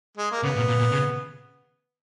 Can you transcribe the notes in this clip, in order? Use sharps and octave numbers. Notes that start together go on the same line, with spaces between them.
G#3
A#3
C#3 B3
A#2
A#2
A#2
C#3